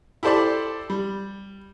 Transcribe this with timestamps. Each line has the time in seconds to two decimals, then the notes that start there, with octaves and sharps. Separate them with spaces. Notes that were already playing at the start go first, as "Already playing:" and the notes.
0.23 E4 G4 A4 C5 D5 A5
0.90 G3